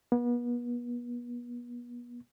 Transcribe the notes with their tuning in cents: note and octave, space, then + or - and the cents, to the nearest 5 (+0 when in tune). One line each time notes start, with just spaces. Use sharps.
B3 -35